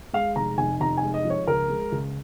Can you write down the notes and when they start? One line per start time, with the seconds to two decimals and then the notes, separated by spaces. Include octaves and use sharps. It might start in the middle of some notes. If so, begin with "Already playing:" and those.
0.13 G#3 F5
0.36 F1 A#5
0.58 F1 G#5
0.81 F1 A#5
0.97 G#5
1.03 G#3
1.14 D#5
1.25 F3
1.30 C#5
1.47 C#2 A#4
1.69 G#3
1.92 C#2